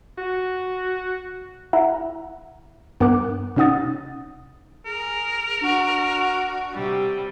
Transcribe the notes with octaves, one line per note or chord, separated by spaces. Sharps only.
F#4
E4 E5 F#5 A#5
G2 B3 A#4 D6 F#6
C3 C#4 D#4 F#5 D#6 A6
G#4 A#4
D4 F#4
C3 G3 E6